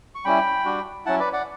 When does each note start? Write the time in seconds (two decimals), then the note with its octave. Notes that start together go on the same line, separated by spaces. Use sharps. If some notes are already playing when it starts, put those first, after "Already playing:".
0.15 C#6
0.25 G3 C#4 E4 G5 B5
0.65 G3 D4 F#4
1.05 F#3 C#4 E4 F#5 A5
1.19 B4 D5
1.33 D5 F#5